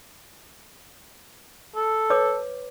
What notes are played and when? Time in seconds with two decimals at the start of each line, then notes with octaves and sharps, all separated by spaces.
1.76 A4
2.10 B4 C#5 D6